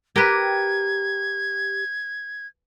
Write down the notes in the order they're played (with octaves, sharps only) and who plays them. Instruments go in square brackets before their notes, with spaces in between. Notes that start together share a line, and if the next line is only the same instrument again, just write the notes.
[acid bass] G4 [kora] A#4 B4 [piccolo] G#6